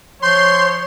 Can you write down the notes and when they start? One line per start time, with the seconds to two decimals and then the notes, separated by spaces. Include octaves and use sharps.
0.22 F3 C#5 C6 G6